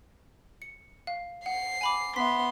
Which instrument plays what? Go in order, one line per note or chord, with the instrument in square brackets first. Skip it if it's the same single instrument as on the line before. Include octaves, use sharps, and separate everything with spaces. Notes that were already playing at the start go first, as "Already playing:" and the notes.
[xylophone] C#7
F5
[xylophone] F#5 [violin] C7
[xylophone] G#5 B5 D6
[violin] B3 C6 [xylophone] E5 B6